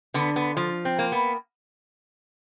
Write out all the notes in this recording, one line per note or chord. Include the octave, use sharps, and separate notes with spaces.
D3 B3
B3
F3
C4
A#3
B3